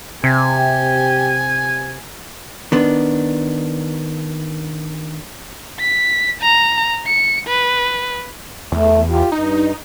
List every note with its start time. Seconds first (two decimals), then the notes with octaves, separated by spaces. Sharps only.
0.24 C3 G4 G#5
2.72 D#3 B3 D4
5.79 B6
6.42 A#5
7.06 C#7
7.47 B4
8.72 E2 A3
9.09 F4 G4
9.32 G2 D#4